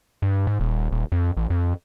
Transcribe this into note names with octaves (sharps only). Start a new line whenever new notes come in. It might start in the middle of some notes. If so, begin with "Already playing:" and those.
G2
G#2
D#1
D#1
F2
A1
F2